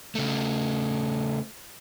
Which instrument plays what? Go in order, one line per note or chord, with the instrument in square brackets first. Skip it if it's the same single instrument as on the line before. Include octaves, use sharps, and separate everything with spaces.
[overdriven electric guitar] C#3 A3